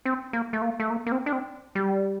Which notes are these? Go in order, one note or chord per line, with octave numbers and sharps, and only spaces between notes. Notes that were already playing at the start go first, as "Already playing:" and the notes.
C4
A#3
A3
A#3
A3
A#3
A#3
C4
D4
C4
G3